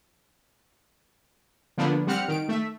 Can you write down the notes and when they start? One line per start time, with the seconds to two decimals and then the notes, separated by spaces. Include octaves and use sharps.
1.78 D3 F3 A#3 B3 D4
2.07 G3 C4 F#5 F6 C#7
2.28 D#3 D7
2.49 A3 E5